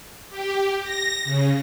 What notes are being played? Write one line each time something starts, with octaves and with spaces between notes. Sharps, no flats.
G4
A#6
C#3